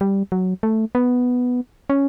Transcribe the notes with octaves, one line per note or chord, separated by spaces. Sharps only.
G3
F#3
A3
B3
C#4